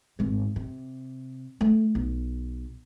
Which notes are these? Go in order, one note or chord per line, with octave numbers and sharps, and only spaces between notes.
G#1 G#3
C3
A3
B1